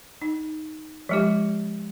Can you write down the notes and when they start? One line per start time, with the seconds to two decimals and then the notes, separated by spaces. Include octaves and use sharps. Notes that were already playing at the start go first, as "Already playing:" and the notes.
0.22 D#4
1.09 F3 G#3 G4